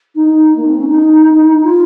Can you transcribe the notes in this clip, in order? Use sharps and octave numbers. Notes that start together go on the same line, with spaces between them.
D#4
A#3
C4
C#4
D#4
F4